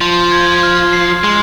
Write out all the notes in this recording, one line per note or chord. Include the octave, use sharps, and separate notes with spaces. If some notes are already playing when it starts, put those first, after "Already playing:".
F3 C6
G#6
F6
C7
G#3 C6